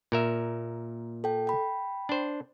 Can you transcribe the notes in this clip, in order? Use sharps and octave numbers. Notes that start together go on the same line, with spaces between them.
A#2 A#4 E5
A4 G5
G5 B5
D4 C5